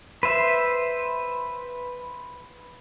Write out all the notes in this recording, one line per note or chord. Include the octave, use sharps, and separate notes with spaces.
B4 C5 E5